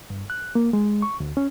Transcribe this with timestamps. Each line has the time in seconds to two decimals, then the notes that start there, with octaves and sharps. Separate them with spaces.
0.10 G2
0.30 F#6
0.55 A#3
0.73 G#3
1.02 C#6
1.20 D2
1.37 C#4